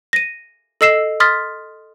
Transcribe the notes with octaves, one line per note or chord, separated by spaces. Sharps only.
A#6 D#7
A4 D#5 E6 C7 E7
C6 D#6 F6 A6 B6